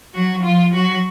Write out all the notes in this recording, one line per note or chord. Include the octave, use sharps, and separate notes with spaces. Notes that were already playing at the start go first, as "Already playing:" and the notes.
F#3 F#4
F3 F4
F#3 F#4